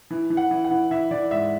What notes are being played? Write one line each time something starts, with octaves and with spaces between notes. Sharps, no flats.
E3
E3
F#5
E3
F#5
E3
E3 E5
E3 D5
G#2 E5